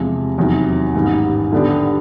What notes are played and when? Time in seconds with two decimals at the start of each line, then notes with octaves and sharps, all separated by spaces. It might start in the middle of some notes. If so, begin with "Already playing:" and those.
Already playing: E2 C3 F3 G#3
0.37 F1 E2 C3 D#3 F#3
0.94 A1 G#2 D#3 G3 B3
1.52 D3 G3 B3 D4 G4